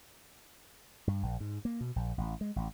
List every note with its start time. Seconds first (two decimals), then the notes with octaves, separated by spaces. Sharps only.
1.07 G2
1.23 A#1
1.40 G#2
1.65 A#3
1.81 B2
1.96 A#1
2.18 A1
2.41 G#3
2.56 A1